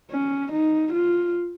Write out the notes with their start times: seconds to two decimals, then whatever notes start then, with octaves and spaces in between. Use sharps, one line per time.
0.11 C#4
0.52 D#4
0.93 F4